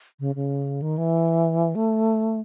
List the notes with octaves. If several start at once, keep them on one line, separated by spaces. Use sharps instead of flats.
C#3
C#3
D#3
E3
A3